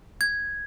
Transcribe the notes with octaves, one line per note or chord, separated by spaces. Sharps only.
G#6